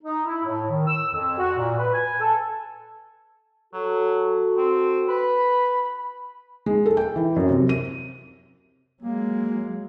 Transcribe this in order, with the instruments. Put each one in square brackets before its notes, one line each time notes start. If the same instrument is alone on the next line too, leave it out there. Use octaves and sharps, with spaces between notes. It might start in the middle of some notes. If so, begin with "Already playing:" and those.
[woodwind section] D#4
E4
A2
D#3
E6
F2
F#4
A#2
B4
G#5
A4
[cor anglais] F#3 [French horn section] F#4 A4
[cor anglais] C4
[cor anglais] B4 [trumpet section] B5
[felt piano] G#3
A4
G5
E3
F#2
C3
D#7
[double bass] F#3 G#3 [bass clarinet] A#3